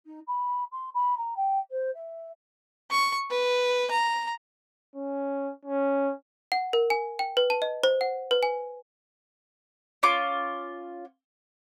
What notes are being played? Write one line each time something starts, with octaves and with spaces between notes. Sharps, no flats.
D#4
B5
C6
B5
A#5
G5
C5
E5
C#6
B4
A#5
C#4
C#4
F#5
A#4
G#5
G5
B4
A5
D#5
C5
F#5
B4
G#5
C#4 F4 D6